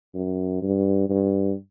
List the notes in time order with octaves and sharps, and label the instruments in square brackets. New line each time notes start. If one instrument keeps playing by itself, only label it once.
[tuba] F#2
G2
G2